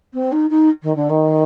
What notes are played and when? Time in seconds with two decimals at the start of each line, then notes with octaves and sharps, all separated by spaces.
0.13 C4
0.32 D#4
0.50 D#4
0.83 D#3
0.96 D3
1.09 D#3